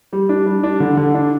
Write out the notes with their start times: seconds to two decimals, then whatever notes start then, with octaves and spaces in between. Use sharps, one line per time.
0.13 G3
0.29 D4
0.46 G3
0.63 D4
0.80 D3
0.97 D3
1.14 D4